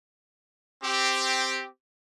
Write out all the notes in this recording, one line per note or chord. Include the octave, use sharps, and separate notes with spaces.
C4 G4